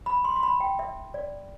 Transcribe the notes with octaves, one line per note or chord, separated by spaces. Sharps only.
B5
C6
C6
B5
G5
E5
D5